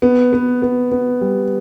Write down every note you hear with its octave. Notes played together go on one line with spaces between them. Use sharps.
B3
B3
B3
B3
G3